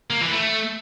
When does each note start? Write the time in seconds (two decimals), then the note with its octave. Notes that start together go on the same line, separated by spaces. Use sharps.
0.10 A#3
0.21 E3
0.32 A3